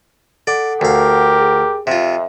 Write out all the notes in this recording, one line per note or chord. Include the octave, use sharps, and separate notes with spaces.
A4 D5 F#5
D2 G4 A#4 F5
G#4
F2 C3 F4 E5